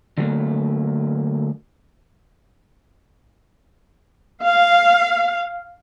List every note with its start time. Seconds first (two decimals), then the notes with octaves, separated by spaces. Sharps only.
0.18 D3 F#3 A3 A#3
4.43 F5